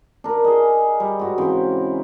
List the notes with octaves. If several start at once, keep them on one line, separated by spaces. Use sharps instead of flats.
D4 A#4
G#4 D#5
G3
G#2 F#4
C#3 E3 C4